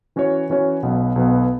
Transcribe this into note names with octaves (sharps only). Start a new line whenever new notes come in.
E3 C#4 F#4 C#5
E3 C#4 F#4 C#5
B1 B2 B3
B1 B2 B3